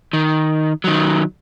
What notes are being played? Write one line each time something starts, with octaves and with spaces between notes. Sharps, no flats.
D#3
D#3 F#3